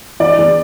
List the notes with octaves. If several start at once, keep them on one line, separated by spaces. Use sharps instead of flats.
E3 D5
E2